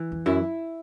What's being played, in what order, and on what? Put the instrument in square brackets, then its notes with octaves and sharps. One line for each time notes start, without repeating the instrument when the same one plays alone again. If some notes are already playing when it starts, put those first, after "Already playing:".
Already playing: [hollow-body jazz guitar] E3
[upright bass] E2
[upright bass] F#2 [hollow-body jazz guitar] E4